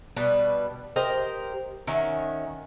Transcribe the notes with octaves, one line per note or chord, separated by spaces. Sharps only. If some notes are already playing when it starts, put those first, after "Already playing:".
B2 G3 D4 B4
G4 A#4 C5 D#5
D#3 C#4 F#4 E5